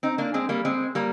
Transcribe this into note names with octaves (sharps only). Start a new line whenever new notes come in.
C4 D#4
A#3 D4
G#3 C4
G3 A#3
G#3 C4
G3 A#3